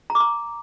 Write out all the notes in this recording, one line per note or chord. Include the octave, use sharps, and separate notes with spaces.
A#5
D6
A#5